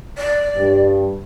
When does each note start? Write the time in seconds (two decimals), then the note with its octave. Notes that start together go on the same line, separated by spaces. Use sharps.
0.17 D5
0.56 G2